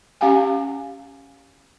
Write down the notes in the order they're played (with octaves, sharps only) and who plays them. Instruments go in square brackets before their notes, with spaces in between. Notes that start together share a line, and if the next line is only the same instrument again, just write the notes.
[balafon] C#4 G4 F5 F#5 G#5